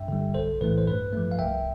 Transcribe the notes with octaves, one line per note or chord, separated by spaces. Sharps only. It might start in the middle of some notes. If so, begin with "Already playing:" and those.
Already playing: G2 E5 G5
D3 G3
B1 A4 C5
A2 E3 A3 B4
C5
G2 B4
F3 A3
F5
C2 E5 G5